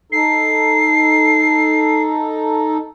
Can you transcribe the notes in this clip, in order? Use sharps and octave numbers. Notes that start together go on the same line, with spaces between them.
D#4 A4 C7